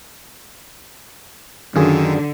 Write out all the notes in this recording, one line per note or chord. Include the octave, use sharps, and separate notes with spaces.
F#2 D3 D#3 F4 G#4